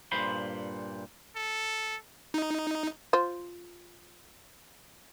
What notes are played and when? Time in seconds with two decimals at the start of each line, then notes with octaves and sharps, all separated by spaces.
0.12 G2 A#2 C5 B5 C6
1.36 A4
2.34 D#4
3.13 F4 C5